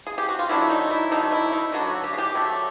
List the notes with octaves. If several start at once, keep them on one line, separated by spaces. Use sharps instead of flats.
G#4
G4
F#4
F4
D3 F#3 A3 D4 E4
D#4
E4
D3 F#3 A3 D4 D#4
E4
D#4
D3 F#3 A3 D4
F#4
G4
G#4
G4
D3 F#3 A3 D4